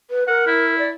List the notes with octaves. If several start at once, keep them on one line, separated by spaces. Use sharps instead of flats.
B4
A#4 F#5
E4
D5